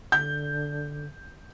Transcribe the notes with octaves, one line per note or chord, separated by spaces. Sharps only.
D3 G6